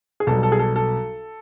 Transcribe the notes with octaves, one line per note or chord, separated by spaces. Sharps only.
G#4
B1 B2 G3 A4
A4
G#4
A4
A4